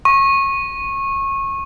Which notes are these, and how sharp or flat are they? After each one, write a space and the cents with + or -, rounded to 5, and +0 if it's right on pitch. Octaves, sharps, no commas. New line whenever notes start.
C#6 -25